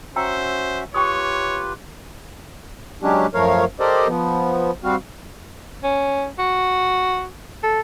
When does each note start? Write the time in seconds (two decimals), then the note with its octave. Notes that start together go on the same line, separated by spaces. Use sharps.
0.16 C#4 F#4 C5 E5 G5 A#5 E6
0.94 F4 G4 B4 C#5 G5 C#6 D#6
3.03 F#3 G#3 C#4 D4 G4
3.34 F#2 F3 A3 A#4 C#5 F5
3.80 G4 A4 A#4 C5 D5 D#5
4.08 F3 B3
4.84 G3 C4 F#4 F5
5.84 C#4
6.39 F#4
7.63 A4